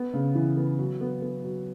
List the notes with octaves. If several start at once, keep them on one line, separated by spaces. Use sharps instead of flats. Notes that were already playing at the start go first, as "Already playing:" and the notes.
Already playing: B3
C#3
E3
B3
F#3
B3
B3
F#3